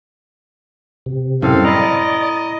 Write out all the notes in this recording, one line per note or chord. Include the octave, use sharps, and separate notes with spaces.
C3
F#2 A2 G3 C4 A4 F5
D5 D#5 A#5 B5